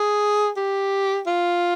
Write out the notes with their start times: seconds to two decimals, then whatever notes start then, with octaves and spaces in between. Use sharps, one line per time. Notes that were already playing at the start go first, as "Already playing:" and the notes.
Already playing: G#4
0.56 G4
1.26 F4